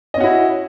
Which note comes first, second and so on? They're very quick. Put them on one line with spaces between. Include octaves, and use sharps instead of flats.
D#5 C#4 F#4 E4